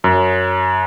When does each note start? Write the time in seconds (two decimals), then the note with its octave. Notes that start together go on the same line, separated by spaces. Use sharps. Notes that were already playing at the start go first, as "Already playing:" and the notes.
0.04 F#2